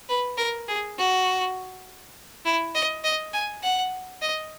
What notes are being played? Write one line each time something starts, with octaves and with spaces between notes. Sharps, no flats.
B4
A#4
G#4
F#4
E4
D#5
D#5
G#5
F#5
D#5